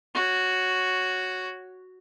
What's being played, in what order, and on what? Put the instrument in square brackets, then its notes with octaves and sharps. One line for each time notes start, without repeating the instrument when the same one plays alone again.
[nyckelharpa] F#4 C#5